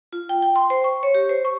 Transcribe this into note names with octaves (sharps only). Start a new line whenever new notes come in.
F4
G5
G5
C6
C5
C#6
C#5
G4
C5
C#6